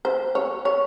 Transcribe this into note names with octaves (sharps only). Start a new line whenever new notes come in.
C5
C#5
C#5